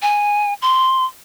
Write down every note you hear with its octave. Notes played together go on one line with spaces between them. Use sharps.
G#5
C6